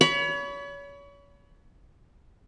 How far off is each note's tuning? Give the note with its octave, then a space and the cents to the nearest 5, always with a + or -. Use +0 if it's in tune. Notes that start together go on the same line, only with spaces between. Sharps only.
C#5 +35 B5 +0